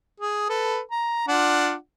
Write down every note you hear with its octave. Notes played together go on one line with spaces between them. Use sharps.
G#4
A4 B4
A#5
D4 F4 F#5